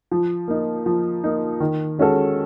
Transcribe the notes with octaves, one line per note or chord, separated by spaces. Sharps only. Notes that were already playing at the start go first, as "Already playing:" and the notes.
F3
A#3 D#4
F3
A#3 D#4
D#3
G#3 C#4 F#4 A4